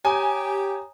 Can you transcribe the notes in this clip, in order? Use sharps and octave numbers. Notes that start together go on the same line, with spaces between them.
G4 C#5 G#5 A#5 D#6